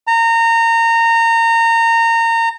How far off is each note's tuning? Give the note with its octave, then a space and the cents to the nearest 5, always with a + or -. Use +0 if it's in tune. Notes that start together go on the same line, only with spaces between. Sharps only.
A#5 -25